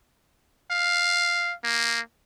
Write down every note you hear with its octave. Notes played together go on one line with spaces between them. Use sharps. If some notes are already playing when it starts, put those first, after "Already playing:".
F5
A#3